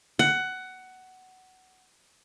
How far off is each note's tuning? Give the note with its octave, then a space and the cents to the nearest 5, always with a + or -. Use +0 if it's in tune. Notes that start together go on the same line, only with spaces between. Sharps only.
F#5 +15